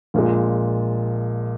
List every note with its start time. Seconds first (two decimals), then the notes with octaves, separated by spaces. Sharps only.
0.14 A#1 A#2 G#3